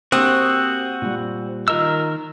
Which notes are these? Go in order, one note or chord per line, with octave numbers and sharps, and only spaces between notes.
A#3 C4 F#4 G4 D#6
A#2 G3
D#3 F4 A#4 D#5 E6